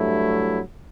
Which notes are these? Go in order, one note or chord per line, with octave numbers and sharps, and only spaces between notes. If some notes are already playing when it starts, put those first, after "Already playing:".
Already playing: G2 F#3 A3 E4